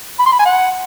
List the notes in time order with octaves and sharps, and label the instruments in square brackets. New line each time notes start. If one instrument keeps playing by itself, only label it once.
[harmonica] B5
C6
B5
G#5
F#5